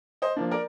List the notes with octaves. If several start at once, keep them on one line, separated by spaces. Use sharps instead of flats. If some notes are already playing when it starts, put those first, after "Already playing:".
C5 D#5
F3 A#3 D4
A#4 D5